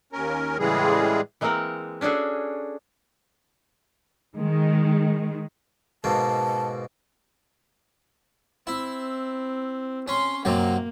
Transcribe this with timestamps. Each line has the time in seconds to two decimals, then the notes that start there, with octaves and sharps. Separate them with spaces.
0.13 D#2 C#4 A#4
0.59 A2 C#3 E3 G3 G#3 G#4
1.41 E3 G#3 A#3 C4 A#4 F#5
2.01 C#4 D4 F#4 G#4 A4
4.37 D#3 G#3
6.04 G#2 B2 A#3 A5
8.67 C4 E4
10.08 C#4 C6
10.45 F#2 C3 F#3 A#3